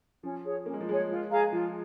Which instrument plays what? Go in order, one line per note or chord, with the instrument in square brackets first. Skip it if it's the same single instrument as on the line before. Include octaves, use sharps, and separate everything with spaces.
[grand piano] F3 [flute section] C#4
[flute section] G#4 C#5
[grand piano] A#3 [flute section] C#4
[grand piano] G#3
F3
[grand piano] G#3 [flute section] G#4 C#5
[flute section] F4
G#4 F5 A#5
[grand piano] F3 [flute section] F4